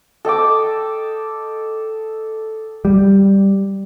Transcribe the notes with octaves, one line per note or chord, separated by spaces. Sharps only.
A4 D#5 G5 D6
G3